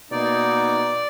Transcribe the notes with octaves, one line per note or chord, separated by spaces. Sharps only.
B2 A#3 D#4 D5